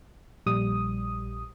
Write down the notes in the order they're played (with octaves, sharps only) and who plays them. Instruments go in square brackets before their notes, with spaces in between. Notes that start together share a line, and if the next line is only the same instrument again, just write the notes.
[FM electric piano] A#1 G3 D#6